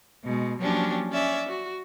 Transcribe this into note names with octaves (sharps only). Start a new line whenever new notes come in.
B2 G#3
F3 F#3 A#3 C#4 D4 G4
C#4 D5 E5
F#4